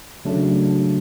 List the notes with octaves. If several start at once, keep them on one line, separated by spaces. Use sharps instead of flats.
C#3 F#3 A3 D4